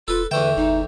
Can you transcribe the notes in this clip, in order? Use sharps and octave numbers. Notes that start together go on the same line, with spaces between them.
E1 F4 A4 B4
E2 D3 A3 B4 E5 G5
G1 D#4